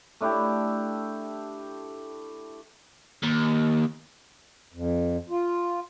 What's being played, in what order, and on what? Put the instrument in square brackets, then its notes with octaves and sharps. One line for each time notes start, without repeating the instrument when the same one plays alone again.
[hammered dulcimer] A3 D4 E4 G4
[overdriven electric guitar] D#2
[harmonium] F2
F4